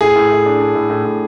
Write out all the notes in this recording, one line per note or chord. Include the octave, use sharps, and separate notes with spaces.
A2 G#4
A2
A2
D4
D4
A2
A2
A2